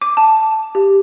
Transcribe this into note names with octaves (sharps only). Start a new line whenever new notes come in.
D6
A5
G4